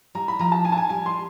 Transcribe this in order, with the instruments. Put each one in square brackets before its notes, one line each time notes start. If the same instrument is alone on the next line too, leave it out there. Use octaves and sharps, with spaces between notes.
[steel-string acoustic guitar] G3 [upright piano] A#5
[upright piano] B5
[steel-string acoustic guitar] F3 [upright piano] A#5
[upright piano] A5
[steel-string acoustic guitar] D#4 [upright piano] G#5
[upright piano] A5
G#5
[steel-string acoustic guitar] G3 [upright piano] G#5
[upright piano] C6